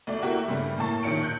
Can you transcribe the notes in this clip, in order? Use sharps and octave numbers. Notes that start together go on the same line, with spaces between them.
D2 A3 D5
A3 A#3 E4 F#4 G4 A#4
G2 C#3 G3 A3
A2 A#3 A5 C#6
A#1 D#3 C#5 C#7 D7
F#6 G6